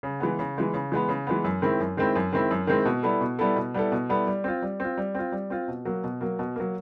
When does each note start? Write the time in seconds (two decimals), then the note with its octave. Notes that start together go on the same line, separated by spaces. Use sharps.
0.03 C#3
0.20 E3 G#3 B3
0.39 C#3
0.57 E3 G#3 B3
0.74 C#3
0.92 E3 G#3 B3
1.09 C#3
1.27 E3 G#3 B3
1.44 F#2
1.62 D#3 G#3 C4 E4
1.80 F#2
1.97 D#3 G#3 C4 E4
2.16 F#2
2.33 D#3 G#3 C4 E4
2.51 F#2
2.67 D#3 G#3 C4 E4
2.85 B2
3.03 G3 B3 E4 A4
3.21 B2
3.39 G3 B3 E4 A4
3.56 B2
3.74 G3 B3 E4 A4
3.92 B2
4.09 G3 B3 E4 A4
4.27 G3
4.44 C4 F4
4.62 G3
4.80 C4 F4
4.97 G3
5.15 C4 F4
5.32 G3
5.50 C4 F4
5.68 B2
5.85 F#3 A#3
6.04 B2
6.21 F#3 A#3
6.39 B2
6.56 F#3 A#3